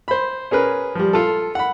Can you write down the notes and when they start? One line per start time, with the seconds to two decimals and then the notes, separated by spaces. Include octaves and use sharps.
0.08 C5 B5
0.51 C#4 G#4 A#4 B4
0.95 F3 G3
1.13 F4 A4
1.55 F#5 B5